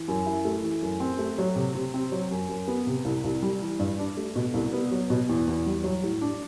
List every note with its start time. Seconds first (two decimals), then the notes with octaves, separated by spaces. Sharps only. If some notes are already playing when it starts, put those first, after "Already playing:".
Already playing: E3
0.08 F#2
0.26 E4
0.45 A3
0.63 E3
0.82 F#2
1.00 C4
1.19 A3
1.38 F#3
1.56 C3
1.75 C3
1.94 C4
2.12 F#3
2.31 F#2
2.49 F#2
2.68 B3
2.87 C3
3.05 C2
3.24 C2
3.43 G3
3.62 E3
3.80 G2
3.99 D4
4.17 A3
4.36 B2
4.54 C2
4.73 B3
4.91 F#3
5.10 B2
5.29 E2
5.47 E2
5.66 G3
5.84 F#3
6.04 A2
6.21 D4